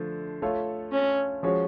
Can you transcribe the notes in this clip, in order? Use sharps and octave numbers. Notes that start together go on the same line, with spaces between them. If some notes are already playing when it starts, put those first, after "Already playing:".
Already playing: D3 F3 A3
A3 F4 A4 C#5
C#4
F3 G#3 C#4 F#4 C#5